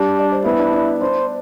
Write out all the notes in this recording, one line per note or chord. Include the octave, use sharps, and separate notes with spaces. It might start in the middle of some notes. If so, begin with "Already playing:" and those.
Already playing: G3 D4 G4
D5
C5
B3 E4 B4
D4 D5
D4 D5
D4 C5 D5